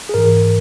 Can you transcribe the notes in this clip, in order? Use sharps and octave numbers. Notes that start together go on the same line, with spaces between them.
G#4
G#2 E3 A#4